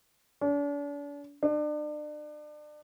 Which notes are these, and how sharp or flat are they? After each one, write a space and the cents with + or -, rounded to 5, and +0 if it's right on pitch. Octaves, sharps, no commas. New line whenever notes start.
D4 -40
D4 +35